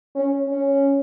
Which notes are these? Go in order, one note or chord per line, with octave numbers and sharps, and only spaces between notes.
C#4
C#4